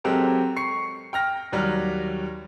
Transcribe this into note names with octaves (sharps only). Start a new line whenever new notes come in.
F#3 G#3 C4 G4 A4 A#4
C#6 C7 C#7
G5 F6 A#6
D#2 F#3 G3 D5 F6